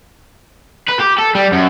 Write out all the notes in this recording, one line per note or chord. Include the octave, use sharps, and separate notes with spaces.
B4
G4
A4
G3
F#2